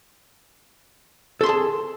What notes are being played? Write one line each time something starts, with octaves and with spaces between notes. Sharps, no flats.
G#4 A4 A5 C6